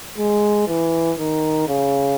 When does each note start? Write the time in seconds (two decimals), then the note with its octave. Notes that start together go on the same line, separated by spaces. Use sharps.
0.18 G#3
0.68 E3
1.19 D#3
1.68 C#3